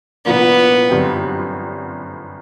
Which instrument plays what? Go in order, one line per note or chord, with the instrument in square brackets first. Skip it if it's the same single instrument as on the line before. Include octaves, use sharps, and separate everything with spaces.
[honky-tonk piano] C2 A#2 F3 A#3 D4 [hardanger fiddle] B3
[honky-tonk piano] G1 F#2 D3 G3 C4